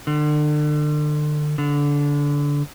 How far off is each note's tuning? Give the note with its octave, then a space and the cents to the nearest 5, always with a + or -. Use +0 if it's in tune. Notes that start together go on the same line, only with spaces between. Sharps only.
D3 +35
D3 -20